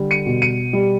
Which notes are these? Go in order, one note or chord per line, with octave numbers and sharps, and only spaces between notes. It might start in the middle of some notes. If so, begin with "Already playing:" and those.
Already playing: D3 G3
C#7 D#7
B2
C#7 D#7
G3